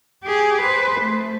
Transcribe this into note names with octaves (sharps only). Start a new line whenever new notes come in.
G4 G#4
B4 C5
A3